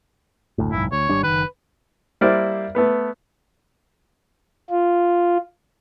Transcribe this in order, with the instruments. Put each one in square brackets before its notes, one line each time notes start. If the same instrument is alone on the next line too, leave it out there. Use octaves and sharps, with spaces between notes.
[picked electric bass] F#1 D2 A2
[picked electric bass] F#1 B1 G#2 [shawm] E4
[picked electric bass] D2 [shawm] C#5
[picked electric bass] G#1 G3 D4
[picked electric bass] F#1 D#3 [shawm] B4
[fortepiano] G3 A#3 E4 A#4 C5 D5
A3 B3 B4
[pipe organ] F4